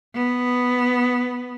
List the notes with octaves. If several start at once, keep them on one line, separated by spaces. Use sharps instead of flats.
B3